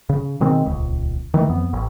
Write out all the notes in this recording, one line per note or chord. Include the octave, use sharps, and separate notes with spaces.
C#3
B2 D#3 G#3 C4
D#1 C#2
D#3 E3 A3
F2 B3
A1